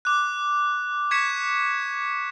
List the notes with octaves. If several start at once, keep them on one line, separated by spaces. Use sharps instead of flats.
D6 F#6
C#6 G#6 B6 C#7 E7